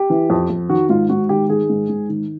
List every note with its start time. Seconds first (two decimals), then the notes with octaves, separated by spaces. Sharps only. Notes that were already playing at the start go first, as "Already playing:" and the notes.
Already playing: G4
0.10 E3
0.30 F2
0.50 F2
0.69 D#3 F#4
0.89 G#2 F4
1.09 G#2 F#4
1.29 D#3 G4
1.49 D#3 G#4
1.70 G#2
1.89 G#2
2.09 D#3